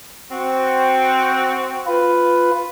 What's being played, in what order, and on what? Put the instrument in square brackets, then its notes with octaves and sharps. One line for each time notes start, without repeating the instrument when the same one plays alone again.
[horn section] C4 F#4
[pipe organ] F4 B4